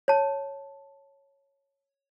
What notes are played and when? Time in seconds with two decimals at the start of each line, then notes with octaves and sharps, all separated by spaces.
0.08 C#5 A5